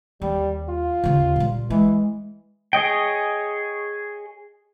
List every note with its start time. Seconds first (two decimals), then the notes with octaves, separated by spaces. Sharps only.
0.22 D#2 G3
0.69 F4
1.04 D#2 C#3
1.36 A#2 G3
1.70 E3 G#3
2.73 G#4 C#5 D#5 G5